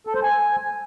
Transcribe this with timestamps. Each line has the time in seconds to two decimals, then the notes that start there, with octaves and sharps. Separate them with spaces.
0.07 A4
0.15 C5
0.23 G#5